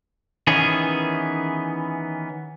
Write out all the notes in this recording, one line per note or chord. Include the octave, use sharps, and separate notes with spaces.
D#3 E3 B3 C#4 G#4